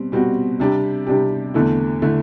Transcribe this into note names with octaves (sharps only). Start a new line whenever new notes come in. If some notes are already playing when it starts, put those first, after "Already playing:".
Already playing: B2 G3 C4
B2 G3 C4 F#4
C3 G3 D4 G4
C3 G3 D4 G4
E2 D3 A3 E4
D3 A3 E4